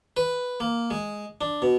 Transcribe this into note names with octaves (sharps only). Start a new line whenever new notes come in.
B4
A#3
G#3
D4
B2